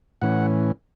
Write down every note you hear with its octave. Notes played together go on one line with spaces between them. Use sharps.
A2 E3 C#4 F#5